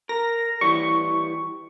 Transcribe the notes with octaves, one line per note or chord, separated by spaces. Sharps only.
A#4 A#6
E3 G3 C#6